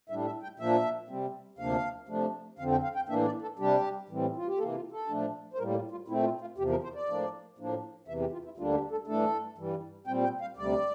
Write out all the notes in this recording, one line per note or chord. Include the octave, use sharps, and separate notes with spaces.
A2 G3 D4 E5
E5
G5
A#2 F3 A#3 D4 E5
C3 G3 C4
D2 C3 F3 A#3 D4 F5
C3 F3 A3 D4
F2 D3 F3 C4 F5
G5
F5
G5
A2 E3 A#3 D4 E5
D5
A4
C3 G3 D4 G4
A2 E3 G3 C4
F4
G4
C3 E3 A#3 A4
F4
A4
A#2 F3 A3 D4
C5
A2 G3 A#3 A#4
F4
F4
A#2 A3 C4 E4
F4
F4
E2 C3 F3 G4
A#4
C5
D5
A2 F3 A#3 D4
A2 F3 A#3 D4
E2 C3 E3 E5
G4
F4
E4
D2 D3 G3 A#3 D4 F4
G4
A4
G2 E3 A3 D4 A4
G2 E3 G3
A#2 G3 C4 G5
G5
F5
D2 C3 G3 D5